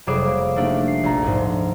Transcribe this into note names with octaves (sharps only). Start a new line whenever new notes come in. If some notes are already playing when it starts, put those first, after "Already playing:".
F1 F#3 G3 G#4 D6 E7
A#3
A3 A#3 D4 D#4 G4
C7
A#1 A#5
D2 G#2